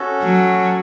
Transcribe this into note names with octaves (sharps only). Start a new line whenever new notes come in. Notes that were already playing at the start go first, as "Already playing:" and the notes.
Already playing: C#4 F#4 A4
F#3